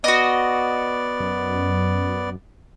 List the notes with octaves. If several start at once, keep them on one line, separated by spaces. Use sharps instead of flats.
B3 F#4 D5 D#5
F#2